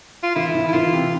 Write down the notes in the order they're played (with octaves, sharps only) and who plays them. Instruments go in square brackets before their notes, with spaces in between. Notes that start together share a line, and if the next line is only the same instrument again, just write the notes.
[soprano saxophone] F4
[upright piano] E3 [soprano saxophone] E4
[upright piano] E3
[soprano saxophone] E4
[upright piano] E3 [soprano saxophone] F4
[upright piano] C3